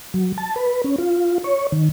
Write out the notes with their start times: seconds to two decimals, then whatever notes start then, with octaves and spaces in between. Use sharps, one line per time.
0.14 F#3
0.38 A5
0.56 B4
0.84 C#4
0.98 F4
1.44 C#5
1.72 D#3